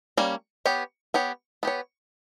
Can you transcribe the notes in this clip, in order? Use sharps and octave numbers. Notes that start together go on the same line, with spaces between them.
G3 A#3 C#4
B3 G4 C#5
B3 G4 C#5
B3 G4 C#5